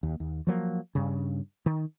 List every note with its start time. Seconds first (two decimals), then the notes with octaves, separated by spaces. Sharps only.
0.03 D#2
0.20 D#2
0.47 F3 F#3 A#3
0.95 G2 C#3
1.66 D#3